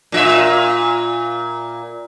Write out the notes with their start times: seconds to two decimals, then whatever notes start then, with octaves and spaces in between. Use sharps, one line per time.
0.12 A#2 F4 E5